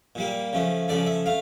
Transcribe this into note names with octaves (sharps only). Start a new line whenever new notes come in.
A#2 G3 A#3
C#3 F3 A3
C#3 F3 A3 D5
E5
A3 F5